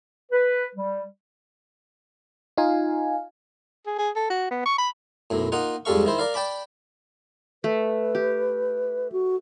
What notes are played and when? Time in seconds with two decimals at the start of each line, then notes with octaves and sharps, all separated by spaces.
0.32 B4
0.76 G3
2.57 D#4 F4 F5 G#5
3.86 G#4
3.98 G#4
4.16 A4
4.30 F#4
4.51 B3
4.66 C#6
4.78 B5
5.30 B1 F#2 A2
5.52 A#3 D#4 F4 F#5
5.85 F2 G#2 G3 A4 F5 C#6
6.05 D#3 E4 C5
6.18 A#4 D5 F5
6.34 D5 G5 A5 B5 D6
7.64 A3 B4
8.15 G4
9.12 F#4